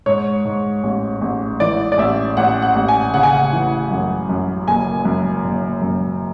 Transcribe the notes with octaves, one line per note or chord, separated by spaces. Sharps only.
G#2 C#5
G#2
A1
A1
E3 D5
D5
A1 E5
A1 F#5
F#5
A1
G#5
C#3 F#5
G#5
F#5
E3
F#2
F#2
F#1 G#5
F#2
F#1
F#2